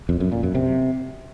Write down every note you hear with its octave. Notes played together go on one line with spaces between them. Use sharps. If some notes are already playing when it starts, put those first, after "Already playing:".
F2
F#2
A#2
F#2
C3